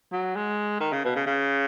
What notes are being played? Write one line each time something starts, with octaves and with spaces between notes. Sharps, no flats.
F#3
G#3
D#3
C#3
B2
C#3
C#3